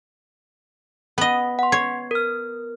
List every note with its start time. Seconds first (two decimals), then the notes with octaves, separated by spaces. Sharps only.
1.18 B3 D#5 F#5
1.59 F#5 C6
1.72 C#5 C7
2.11 A#4 F6